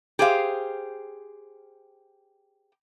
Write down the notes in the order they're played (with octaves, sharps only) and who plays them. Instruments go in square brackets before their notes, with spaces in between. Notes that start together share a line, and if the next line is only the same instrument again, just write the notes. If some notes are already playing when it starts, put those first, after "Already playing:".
[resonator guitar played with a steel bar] G4 G#4 C5 F5